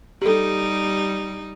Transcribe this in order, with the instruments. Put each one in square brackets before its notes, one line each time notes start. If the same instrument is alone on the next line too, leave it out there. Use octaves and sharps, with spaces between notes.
[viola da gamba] G3 D#4 [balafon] G4 A4